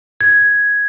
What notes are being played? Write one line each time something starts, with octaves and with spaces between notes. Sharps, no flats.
G#6